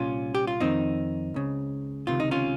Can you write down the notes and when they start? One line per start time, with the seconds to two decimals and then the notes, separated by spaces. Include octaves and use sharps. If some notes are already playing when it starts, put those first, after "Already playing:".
Already playing: C2 A#2 C#4 F4
0.35 G4
0.47 F4
0.60 F2 D#3 C4 D#4
1.34 C#2 C#3
2.07 C#2 C3 D#3 F4
2.20 D#4
2.31 C#4 F4